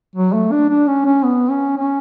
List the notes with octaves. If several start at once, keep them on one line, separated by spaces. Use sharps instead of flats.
F#3
A3
D4
D4
C#4
C#4
B3
C#4
C#4